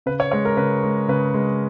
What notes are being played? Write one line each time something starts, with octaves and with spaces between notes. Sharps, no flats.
C#3 B4
C#5
G#3 C#5
A#4
C#3 B4
G#3
C#3 B4
G#3